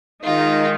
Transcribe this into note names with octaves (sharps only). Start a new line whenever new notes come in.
D#3 G#3 D#4 F4